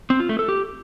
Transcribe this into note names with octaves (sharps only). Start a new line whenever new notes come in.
C4
F4
A3
A4
G4